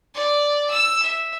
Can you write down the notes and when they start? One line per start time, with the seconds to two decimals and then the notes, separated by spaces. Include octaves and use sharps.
0.14 D5
0.71 E6
1.02 E5